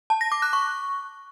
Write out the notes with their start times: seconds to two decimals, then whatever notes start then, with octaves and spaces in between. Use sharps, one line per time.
0.10 A5
0.21 A#6
0.32 D6
0.42 F#6
0.53 C#6